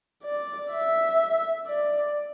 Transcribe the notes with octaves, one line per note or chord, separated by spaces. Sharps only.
D5
E5
D5